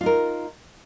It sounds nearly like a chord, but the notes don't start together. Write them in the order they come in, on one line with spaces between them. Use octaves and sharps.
F4 D#4 A#4